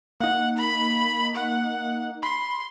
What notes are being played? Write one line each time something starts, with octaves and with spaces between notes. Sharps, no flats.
A#3 D#4 F#5
B5
F#5
B5 C6